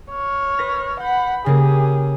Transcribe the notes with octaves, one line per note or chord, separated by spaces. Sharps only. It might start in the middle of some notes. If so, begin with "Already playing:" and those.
C#5 F6
B4 A#6
F#5 B5 G6
C#3 A#3 G4 G#4